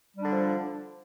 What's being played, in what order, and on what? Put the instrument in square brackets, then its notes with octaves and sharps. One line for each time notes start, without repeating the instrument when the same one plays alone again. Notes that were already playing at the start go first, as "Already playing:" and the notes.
[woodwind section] G3
D4
D3
F3